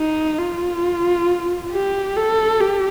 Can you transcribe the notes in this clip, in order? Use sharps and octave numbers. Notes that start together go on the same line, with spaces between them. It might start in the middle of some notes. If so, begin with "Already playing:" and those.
Already playing: D#4
F4
G4
A4
G4